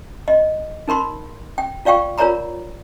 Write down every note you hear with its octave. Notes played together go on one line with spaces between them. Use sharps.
D#5
D#4 A#4 B5 C6
G5
F4 D5 F5 G5 C#6
F4 A#4 C#5 D5 A#5 B5